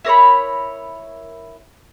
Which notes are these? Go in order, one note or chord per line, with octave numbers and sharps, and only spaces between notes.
E4 A#4 C#5 B5